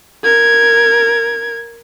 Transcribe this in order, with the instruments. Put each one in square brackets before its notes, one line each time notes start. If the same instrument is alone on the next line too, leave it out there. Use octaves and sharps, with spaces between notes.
[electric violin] A#4 G#6